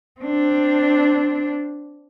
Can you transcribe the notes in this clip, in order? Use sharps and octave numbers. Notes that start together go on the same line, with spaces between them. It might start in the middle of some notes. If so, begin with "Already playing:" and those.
C4 D4